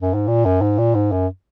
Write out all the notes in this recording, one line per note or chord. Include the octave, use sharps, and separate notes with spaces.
F#2
G#2
A#2
F#2
G#2
A#2
G#2
F#2